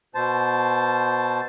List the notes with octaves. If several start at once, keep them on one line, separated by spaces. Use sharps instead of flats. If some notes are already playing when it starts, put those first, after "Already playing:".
B2 C5 A5